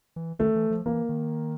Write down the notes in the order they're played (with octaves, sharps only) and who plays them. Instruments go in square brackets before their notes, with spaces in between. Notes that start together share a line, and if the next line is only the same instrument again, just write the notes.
[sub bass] E3
[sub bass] D#3 [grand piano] A3
[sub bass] E3
F3
[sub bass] E3 [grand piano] A#3
[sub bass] D#3